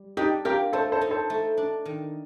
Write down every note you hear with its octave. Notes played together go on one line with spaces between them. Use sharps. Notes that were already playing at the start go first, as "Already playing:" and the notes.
Already playing: G3
D4 D#4 G4
F4 G4 A#4
A3 A4 C5
A4 C5
D#4
A4 C5
A3
D4
D#3